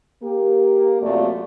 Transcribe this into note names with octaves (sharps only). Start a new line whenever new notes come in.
A#3 G4
F#2 C3 A3 F4 D5